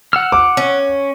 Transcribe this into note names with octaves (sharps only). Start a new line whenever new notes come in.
F#5 E6 F6
D6
C#4